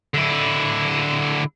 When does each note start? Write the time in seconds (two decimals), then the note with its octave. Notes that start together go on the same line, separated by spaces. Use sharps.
0.14 D3 E4